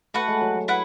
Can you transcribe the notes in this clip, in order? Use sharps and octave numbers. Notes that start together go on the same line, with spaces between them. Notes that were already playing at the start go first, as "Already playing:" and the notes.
A3 F#4 B4 F#5
G#3
F#3
F#3
E4 B4 F#5